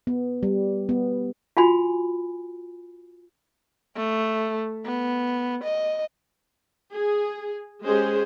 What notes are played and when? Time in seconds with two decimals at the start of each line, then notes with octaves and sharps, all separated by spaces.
0.07 B3
0.43 G3
0.89 B3
1.57 F4 F#4 G#5 B5
3.96 A3
4.86 B3
5.64 D#5
6.92 G#4
7.84 G#3 C#4 G4 G#4 C5